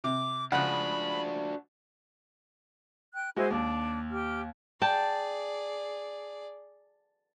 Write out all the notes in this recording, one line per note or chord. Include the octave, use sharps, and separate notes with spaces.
C3 D6
C#3 F3 G#3 D4 F#4 F#5 B5 F#6
G5 F#6
G#3 E4 F#4 C5 G#5
D#2 D4
G4 F6
G#4 D5 G5 A5